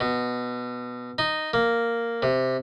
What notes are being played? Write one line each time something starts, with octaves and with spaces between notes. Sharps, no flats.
B2
D#4
A#3
C3